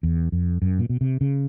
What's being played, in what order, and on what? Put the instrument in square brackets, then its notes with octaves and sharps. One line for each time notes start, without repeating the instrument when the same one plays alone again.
[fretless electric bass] E2
F2
F#2
A#2
B2
C3
C#3